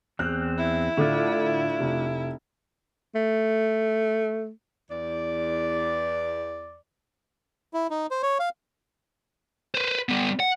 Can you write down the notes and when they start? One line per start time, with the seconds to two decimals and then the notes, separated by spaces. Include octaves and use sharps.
0.19 E2 C4 F6 F#6
0.58 E4
0.97 A2 D3 A3 D4 F4
1.81 F1
3.15 A3
4.91 E2 D5
7.74 E4
7.90 D#4
8.11 C5
8.23 C#5
8.40 F5
9.75 B4 C5
10.09 G3 B3
10.40 F#5